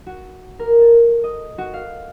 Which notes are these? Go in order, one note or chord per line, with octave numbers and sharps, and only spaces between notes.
F#4
A#4
A4
D#5
F#4
F5